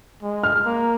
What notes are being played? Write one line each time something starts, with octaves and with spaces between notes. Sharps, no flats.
G#3
F6
A#3